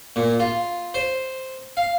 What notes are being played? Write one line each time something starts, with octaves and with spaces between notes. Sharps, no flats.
A#2
F4
C5
F5